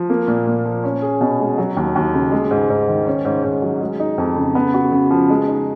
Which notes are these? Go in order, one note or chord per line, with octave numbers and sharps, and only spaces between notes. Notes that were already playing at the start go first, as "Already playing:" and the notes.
Already playing: F3
A#3
A#2
A#2
F3
C#4
G#4
B2
G#3
F#3
D#2
D#2
C#3
G#3
G#2
G#2
D#3
C#4
G#2
G#2
F#3
G#3
D#4
F2
C#3
B3
F#4
C#3
F3
G#3
D#4